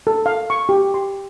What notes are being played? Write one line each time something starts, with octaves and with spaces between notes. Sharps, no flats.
A4
F5
C#6
G4
C6